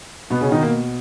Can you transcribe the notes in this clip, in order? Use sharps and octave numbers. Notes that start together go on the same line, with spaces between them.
B2 B3
C#3 C#4
D#3 D#4
A#3